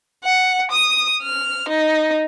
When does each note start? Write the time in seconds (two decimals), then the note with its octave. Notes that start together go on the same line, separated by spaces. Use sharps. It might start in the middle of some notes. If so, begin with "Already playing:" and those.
0.24 F#5
0.71 D#6
1.23 F6
1.69 D#4